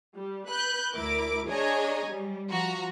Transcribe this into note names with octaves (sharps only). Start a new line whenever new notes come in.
G3
B4 F#6 G6
D2 E4 A#4 D6
D4 G#4 C#5 D#5 G#5 A#5
G3
F3 F#4 A#5